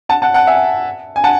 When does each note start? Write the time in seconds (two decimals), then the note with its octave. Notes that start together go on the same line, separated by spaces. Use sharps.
0.09 F#5 A5
0.22 F#5 A5
0.34 F#5 A5
0.47 E5 G#5
1.16 G#5
1.24 F#5 A5